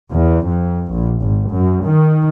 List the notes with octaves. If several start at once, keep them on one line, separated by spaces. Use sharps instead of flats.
E2
F2
A#1
G#1
F#2
D#3